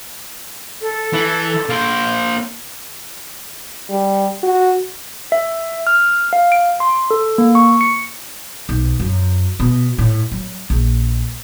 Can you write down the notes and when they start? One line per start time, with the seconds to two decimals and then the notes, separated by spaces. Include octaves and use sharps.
0.82 A4
1.13 E3
1.69 A#3 C5
3.90 G3
4.43 F#4
5.32 E5
5.87 F6
6.33 F5
6.52 D7
6.80 C6
7.11 A4
7.38 A#3
7.55 C#6
7.81 C#7
8.69 B1
9.00 F#2
9.60 B2
9.98 A2
10.32 F#3
10.70 A#1